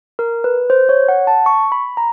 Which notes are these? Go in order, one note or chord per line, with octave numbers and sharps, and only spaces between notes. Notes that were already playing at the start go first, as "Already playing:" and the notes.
A#4
B4
C5
C#5
F#5
A5
C#6
B5
A#5